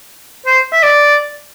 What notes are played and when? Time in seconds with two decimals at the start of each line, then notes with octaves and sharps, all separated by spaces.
0.47 C5
0.72 E5
0.83 D5